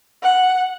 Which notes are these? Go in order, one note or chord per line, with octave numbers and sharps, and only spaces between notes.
F#5